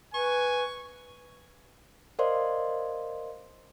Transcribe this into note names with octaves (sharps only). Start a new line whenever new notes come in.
B4 G#5 C#6
A#4 C5 D5 D#5 F5 C6